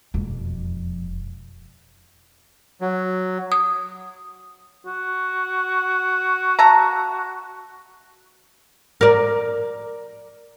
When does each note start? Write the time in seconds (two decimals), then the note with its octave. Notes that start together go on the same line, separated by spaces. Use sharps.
0.14 E1 F2
2.81 F#3
3.52 D#6
4.86 F#4
6.59 E5 A5 A#5
9.01 A#4 D5